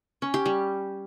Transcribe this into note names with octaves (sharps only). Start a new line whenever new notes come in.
C#4
G4
G3